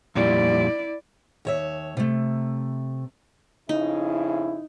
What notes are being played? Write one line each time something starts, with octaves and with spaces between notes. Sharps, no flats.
F2 A#2 G3 E4 D5
D#2 C#5 E5
C3 A3
F2 C#3 D#4 E4